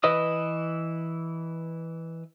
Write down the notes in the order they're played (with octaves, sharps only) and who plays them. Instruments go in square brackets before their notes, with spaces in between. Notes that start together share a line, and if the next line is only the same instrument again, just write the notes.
[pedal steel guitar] E3 E4 B4 D#5 D#6